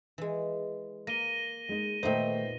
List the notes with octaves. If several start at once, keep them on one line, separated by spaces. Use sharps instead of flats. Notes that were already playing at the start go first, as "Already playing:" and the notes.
E3 G#3
A#3 A#6 D#7 G7
G#3 D#4
A#2 D#3 A3 B3 D#4 C5 E5 G5